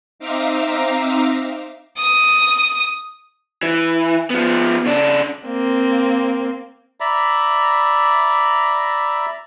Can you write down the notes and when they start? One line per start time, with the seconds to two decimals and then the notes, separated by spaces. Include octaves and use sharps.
0.19 C4 D#4 E5 F5 A#5 D6
1.98 D#6
3.63 E3
4.30 F3 B3
4.86 C#3 D4
5.47 A#3 C4
7.00 D5 E5 A#5 B5